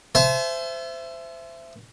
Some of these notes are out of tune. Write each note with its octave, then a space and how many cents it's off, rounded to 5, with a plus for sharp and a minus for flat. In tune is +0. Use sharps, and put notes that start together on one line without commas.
C5 -15 E5 +20 A5 -45